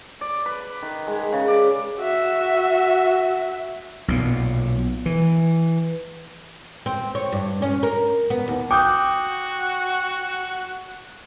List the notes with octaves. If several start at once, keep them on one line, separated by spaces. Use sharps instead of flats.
D5
B4
D#3
G#3
C#3
D5
F#4 E5
B1 A#2
E3
C4
C#5
G2
C#4
A#4
B3
D#2
F#4 G5 D6 D#6 G6